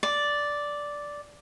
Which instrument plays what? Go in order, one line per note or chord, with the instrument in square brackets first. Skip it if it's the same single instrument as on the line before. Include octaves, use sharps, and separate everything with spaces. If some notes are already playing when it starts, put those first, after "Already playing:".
[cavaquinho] D5